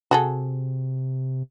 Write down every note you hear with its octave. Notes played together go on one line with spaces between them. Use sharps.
C3 F#4 G#4 A4